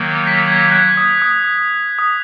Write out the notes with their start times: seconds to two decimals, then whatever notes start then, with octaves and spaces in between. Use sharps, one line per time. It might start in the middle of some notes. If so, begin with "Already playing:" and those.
Already playing: D#3 F#3 A#3
0.27 B6
0.46 G#6
0.71 F#6
0.97 D#6
1.22 D#6
1.99 D#6